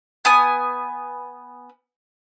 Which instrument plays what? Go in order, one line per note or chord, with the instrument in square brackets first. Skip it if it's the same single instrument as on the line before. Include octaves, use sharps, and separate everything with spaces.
[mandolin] B3 G#5 D#6